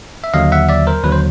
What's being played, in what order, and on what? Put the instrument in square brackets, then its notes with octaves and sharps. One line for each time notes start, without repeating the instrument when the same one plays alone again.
[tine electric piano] E5
D#2 D3 F#3 D#5 F5
E5 F#5
D5 E5
A#4 C5
D#2 D3 F#3 B4
C5